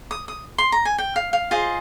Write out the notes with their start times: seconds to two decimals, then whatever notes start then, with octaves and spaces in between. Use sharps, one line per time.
0.11 D#6
0.28 D#6
0.58 C6
0.72 A#5
0.85 G#5
0.98 G5
1.16 F5
1.33 F5
1.51 F4 G#4 C5 D#5